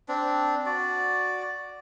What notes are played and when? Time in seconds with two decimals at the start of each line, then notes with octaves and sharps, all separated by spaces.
0.09 C4 D4
0.66 F#4 D5